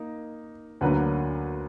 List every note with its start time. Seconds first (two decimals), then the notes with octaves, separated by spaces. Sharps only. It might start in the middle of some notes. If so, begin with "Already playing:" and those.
Already playing: A#3 D#4
0.81 D2 D3 F#3 A#3 B4